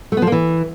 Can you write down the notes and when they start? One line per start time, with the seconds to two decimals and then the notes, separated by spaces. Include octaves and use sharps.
0.12 A3
0.17 B3
0.22 F3
0.27 A#3
0.32 E3